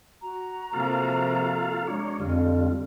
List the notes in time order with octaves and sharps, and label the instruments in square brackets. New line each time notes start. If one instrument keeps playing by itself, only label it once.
[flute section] F#4 A#5
[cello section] C3 F3 A#3 [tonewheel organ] F4 A4 F5
[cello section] G#3 [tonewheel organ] D4 C#5
[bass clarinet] F2 [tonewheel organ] D3 G3 F4